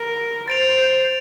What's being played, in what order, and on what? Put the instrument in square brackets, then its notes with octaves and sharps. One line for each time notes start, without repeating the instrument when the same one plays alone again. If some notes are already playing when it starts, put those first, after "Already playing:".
Already playing: [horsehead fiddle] A#4
[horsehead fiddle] C5 [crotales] A6 D7 F7